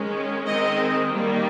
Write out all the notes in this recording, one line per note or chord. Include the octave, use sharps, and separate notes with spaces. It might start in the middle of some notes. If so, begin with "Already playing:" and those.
Already playing: D#3 G#3 C#4
D#3 G#3 C4 D#5
D#3 G3 A#3